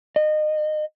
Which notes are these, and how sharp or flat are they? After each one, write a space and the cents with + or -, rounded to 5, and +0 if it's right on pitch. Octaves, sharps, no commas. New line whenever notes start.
D#5 -25